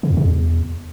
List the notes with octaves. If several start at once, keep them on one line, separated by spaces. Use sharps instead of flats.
C#3
E2
C3
E2